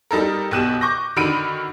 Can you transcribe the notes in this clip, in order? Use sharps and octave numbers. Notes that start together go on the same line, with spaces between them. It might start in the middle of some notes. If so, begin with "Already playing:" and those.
G3 D#4 A4 A#4
B1 B2 G4 F#6 D#7 E7
C#6 D6 G6 A#6
D3 D#3 F#4 B5 D7 D#7